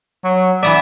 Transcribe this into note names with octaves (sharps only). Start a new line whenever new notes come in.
F#3
E3 B3 D5 E5